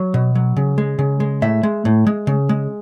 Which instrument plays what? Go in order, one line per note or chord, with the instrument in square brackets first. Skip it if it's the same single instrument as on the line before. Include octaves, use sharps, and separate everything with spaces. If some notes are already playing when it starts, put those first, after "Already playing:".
Already playing: [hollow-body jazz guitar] F#3
B2
F#3
C#3
G#3
C#3
G#3
A2 E5
G#3
A2
G#3
C#3
G#3